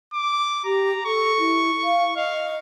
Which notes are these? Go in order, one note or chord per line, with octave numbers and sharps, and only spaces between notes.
D6
G4 A#5
A4 C#6
E4
F5
D#5 F5